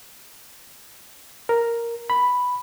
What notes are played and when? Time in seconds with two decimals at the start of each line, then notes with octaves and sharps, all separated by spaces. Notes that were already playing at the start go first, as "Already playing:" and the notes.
1.49 A#4
2.10 B5